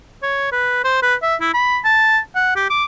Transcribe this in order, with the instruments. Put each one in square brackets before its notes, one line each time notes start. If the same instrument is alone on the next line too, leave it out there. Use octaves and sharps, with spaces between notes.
[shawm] C#5
B4
C5
B4
E5
E4
B5
A5
F#5
G4
D6